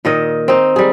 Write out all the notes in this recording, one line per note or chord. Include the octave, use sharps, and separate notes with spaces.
A#2 D#3 D#5
C4 D#4
G3 G#4